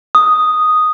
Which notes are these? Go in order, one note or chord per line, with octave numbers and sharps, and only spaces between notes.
D#6